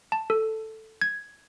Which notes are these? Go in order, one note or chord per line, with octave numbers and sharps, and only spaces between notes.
A5
A4
G#6